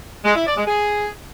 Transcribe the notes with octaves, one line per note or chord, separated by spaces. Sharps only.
G#3
E4
D5
G#3
G#4